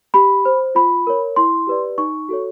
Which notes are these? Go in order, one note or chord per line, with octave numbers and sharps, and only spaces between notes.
G4 B5
C5
F4 B5
A#4 C#5
E4 C6
G4 B4 D5
D#4 C#6
F#4 A4 C#5